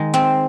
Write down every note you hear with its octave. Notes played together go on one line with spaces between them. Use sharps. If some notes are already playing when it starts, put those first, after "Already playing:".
Already playing: D#3 G#3
C4